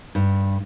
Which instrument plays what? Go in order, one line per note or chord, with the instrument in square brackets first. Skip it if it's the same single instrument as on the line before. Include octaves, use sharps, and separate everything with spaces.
[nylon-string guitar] G2